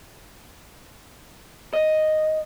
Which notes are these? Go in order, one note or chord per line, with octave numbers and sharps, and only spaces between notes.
D#5